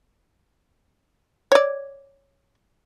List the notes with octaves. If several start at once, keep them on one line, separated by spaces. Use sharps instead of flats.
C#5 D5